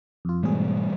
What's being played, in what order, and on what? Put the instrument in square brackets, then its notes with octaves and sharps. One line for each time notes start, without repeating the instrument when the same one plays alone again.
[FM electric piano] F2 F4
[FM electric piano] G#2 B2 G#4 [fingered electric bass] E3 G3 A3